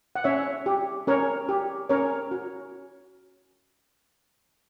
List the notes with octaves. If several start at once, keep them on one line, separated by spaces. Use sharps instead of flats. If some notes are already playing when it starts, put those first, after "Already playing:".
F#5
C#4 C#5 E5
G4
C#4 A#4 C#5
G4
C#4 A#4 C#5
F#4